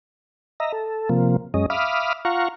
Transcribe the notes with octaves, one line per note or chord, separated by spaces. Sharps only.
D#5 E5 A#5
A4
C3 F3 A#3
F#2 G#3 C#4 D#5
E5 F5 B5 D6 D#6 F6
F4 F5 F#5 A#5 C#6